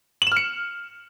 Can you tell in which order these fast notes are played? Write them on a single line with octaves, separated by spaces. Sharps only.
F#7 E7 F6 C#7